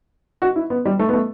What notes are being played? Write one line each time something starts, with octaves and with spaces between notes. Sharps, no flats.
F#4
E4
B3
G3
A3
B3
A3